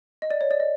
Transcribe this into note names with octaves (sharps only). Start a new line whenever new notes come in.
D#5
D5
C#5
D5
D#5